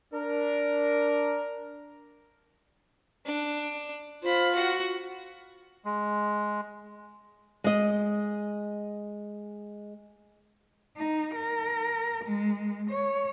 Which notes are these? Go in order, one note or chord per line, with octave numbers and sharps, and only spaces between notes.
D4 A#4
D4
F4 C5 B5
F#4 F#5
G#3
G#3 D#5
D#4
A#4
G#3
C#5